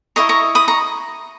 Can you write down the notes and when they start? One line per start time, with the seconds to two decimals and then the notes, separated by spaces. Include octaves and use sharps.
0.16 E4 B4 D#5 A#5 C#6
0.29 A#5 C#6
0.55 B5 D#6
0.68 A#5 C#6